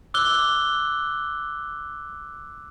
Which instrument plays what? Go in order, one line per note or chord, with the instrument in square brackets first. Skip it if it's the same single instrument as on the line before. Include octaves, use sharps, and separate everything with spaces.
[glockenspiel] D6 E6 F#6 G7